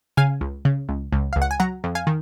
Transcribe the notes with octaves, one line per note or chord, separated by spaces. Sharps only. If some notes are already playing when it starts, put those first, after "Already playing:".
C#3 F5 G#5
C#2
C#3
C#2
C#2
C#2 F5
F#5
G#5
F#3 F#5 A#5
F2
F5 G#5
D#3